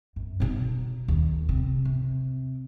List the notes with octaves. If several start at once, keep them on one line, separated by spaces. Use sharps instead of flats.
F#2
B2 D#4
D#2
C3
C3